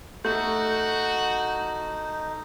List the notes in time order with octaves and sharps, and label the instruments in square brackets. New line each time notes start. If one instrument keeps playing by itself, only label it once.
[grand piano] A3 [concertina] D#4 [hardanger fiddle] F#4 [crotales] G6